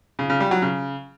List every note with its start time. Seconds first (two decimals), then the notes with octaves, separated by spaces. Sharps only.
0.19 C#3
0.30 C#3
0.40 G3
0.51 F#3
0.62 C#3